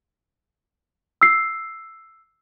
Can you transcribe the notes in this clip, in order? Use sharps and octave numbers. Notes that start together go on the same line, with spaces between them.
E6 C7